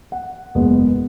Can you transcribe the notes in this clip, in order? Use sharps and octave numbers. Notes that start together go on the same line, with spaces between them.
F#5
F#1 E2 B2 G#3 B3